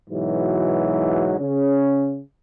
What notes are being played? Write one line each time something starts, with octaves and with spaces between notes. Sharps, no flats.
G#2 B2 E3 F#3
C#3 C#4